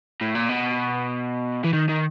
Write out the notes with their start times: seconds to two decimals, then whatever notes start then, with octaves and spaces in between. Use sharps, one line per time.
0.21 A2
0.35 A#2
0.49 B2
1.64 E3
1.73 D#3
1.89 D#3